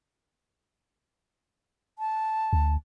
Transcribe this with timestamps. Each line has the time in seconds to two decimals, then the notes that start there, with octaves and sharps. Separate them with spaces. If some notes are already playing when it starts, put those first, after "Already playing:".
1.99 A5
2.53 D2